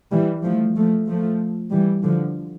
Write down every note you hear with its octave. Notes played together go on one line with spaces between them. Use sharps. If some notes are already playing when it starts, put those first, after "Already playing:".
E3 G3
F3 A3
F3 A3
F3 A3
E3 G3
D3 F3